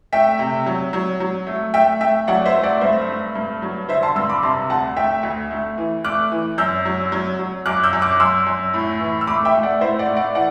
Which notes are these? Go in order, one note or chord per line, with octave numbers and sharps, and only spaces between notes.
A3 E5 G5
C3
F#3
F#3
F#3
A3
A3 E5 G5
A3 E5 G5
F#3 D5 F#5
C5 E5
A3
D5 F#5
G2 C5 E5
A3
G2
F#3
D3 C5 E5
A5 C6
G2 C6 E6
B5 D6
C3 A5 C6
D2 F#5 A5
A3 E5 G5
D2
A3
E3
A3 D6 F#6
E3
F#2 E6 G6
F#3
F#3
F#3
F#2 D6 F#6
E6 G6
F#2
D6 F#6
F#2 C6 E6
F#2
A2
E3
E6
A3 B5 D6
E5 G5
A3
D5 F#5
A2 C5 E5
D5 F#5
A3
D5 F#5
E3 D5 F#5